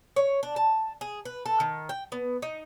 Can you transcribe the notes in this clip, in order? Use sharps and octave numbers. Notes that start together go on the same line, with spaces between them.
C#5
D4
A5
G#4
B4
A4
D#3
G5
B3
D#4